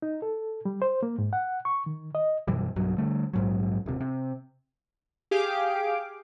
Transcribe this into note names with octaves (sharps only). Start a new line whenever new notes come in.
D#4
A4
G3
C5
A#3
G#2
F#5
C#6
D#3
D#5
F#2 B2 E3 G3
B1 G2 F#3
D3 G3 A3
A#1 G#2 F#3
D#1 C3
C3
G4 G#4 F5 D6